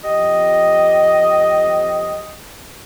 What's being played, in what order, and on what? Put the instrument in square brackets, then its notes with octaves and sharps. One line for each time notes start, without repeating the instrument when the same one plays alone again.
[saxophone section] F2 G4 D#5